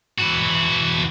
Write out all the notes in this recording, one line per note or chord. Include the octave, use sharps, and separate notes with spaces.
E3 F#4